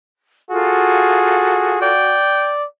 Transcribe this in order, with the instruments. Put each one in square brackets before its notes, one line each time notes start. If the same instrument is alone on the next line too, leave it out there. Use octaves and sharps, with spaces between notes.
[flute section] F4 A4 F5 [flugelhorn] F#4 [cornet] G#4
[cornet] D5 [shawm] G5